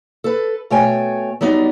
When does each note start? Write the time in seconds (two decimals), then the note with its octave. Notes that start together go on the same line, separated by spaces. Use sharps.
0.24 A4 B4
0.70 B2 A3 C#5 G5 G#5
1.41 F#3 G3 B3 D#4